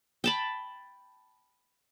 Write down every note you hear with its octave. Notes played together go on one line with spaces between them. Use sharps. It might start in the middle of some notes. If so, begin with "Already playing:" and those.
G5 A5 B5